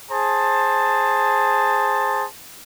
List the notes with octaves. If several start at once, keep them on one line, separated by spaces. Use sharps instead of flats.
G#4 C5 A5